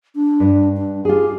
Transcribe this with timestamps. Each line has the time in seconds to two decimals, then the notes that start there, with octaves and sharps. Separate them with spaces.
0.15 D4
0.40 G2
0.77 D4
1.05 F4 G4 G#4